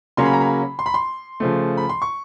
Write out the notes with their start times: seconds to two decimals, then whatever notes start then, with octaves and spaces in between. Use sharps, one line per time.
0.17 C#3 F#3 A#3 C#4 C6
0.25 B5
0.33 A#5
0.41 B5
0.79 C6
0.86 B5
0.94 C6
1.40 C#3 F3 A3
1.77 B5
1.89 C6
2.02 C#6